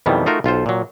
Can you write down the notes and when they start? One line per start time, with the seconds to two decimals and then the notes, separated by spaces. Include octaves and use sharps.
0.06 F2 B2 D#3 E3 G3
0.26 A3 D#4 F4 F#4 A#4
0.44 B1 F4 A4 C5
0.66 A#2 F#3